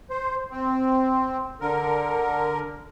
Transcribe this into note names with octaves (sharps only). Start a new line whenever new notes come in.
C5
C4
D3 A#4